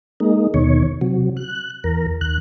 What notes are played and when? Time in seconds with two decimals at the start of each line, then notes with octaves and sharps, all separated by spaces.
0.20 G#3 A#3 D#4
0.54 D#2 B2 D#3 C#5
1.01 C3 F#3
1.37 F#6
1.84 E2 A#4
2.21 D#2 F#6